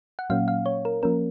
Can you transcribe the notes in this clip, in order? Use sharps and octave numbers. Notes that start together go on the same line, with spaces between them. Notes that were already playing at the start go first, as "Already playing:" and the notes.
F#5
A#2 F#3 A#3 C#4 F5
F5
C#5
A#4
F3 A#3 C#4 A#4